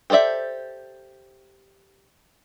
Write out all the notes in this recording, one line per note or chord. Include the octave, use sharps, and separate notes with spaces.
G4 A4 C5 D5 E5